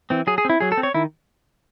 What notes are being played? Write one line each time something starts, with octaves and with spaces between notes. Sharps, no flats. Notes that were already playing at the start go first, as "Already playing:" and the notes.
E3 C4
F#3 G#4
G#4
C4 E4
F#3 G#4
A4
C4
C#5
D#3 E4